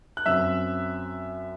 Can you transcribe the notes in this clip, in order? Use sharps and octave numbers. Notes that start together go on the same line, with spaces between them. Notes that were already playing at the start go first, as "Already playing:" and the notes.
F#6
F#2 F#3 C4 E5 E6